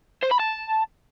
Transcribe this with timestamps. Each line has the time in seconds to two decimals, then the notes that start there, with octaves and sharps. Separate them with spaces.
0.23 C5
0.31 B5
0.39 A5